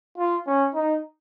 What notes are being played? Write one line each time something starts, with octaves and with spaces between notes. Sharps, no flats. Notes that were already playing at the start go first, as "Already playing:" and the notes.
F4
C#4
D#4